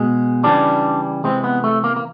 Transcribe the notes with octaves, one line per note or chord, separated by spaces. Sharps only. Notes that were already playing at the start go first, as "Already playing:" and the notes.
Already playing: B2 G#3
C#3 E3 G3 D4
C3 E3 G#3 C4
B3
A3
A#3
A#3